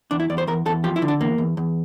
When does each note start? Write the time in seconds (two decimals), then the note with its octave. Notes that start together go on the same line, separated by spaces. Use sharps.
0.11 E2 D4
0.20 E4
0.30 E2 D5
0.38 C5
0.47 E2 A#4
0.66 E2 A4
0.84 F3 G4
0.96 E4
1.02 D3
1.08 D4
1.21 E2 A#3
1.38 E2
1.57 E2